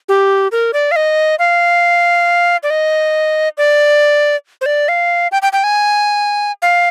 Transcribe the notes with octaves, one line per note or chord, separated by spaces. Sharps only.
G4
A#4
D5
F5
D#5
F5
D5
D#5
D5
C5
D5
F5
G5
G5
G5
G#5
F5